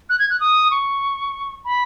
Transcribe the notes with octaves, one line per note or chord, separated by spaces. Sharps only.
F#6
G#6
F#6
D#6
C#6
B5